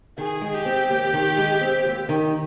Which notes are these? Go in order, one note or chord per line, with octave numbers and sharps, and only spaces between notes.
D#3 G#4
G#3
G4
C4
D#2
D#3
G#3
C4
D#2
D#3